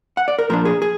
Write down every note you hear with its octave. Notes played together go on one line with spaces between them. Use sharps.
F#5
D5
A#4
A#2 F3 A#3 D4 A#4
G#4
G#4